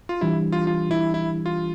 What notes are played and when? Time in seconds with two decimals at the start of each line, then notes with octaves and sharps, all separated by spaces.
0.09 F4
0.21 E3 G3 D4 E4 G4
0.52 F4
0.67 F4
0.91 E4
1.14 E4
1.46 F4